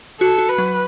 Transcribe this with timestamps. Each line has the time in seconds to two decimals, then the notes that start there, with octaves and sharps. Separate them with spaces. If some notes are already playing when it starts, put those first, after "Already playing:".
0.20 F#4 A4
0.39 F#4
0.49 B4
0.58 F#3